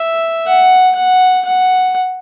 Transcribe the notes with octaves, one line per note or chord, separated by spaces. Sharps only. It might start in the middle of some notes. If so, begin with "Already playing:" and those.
Already playing: E5
F#5
F#5
F#5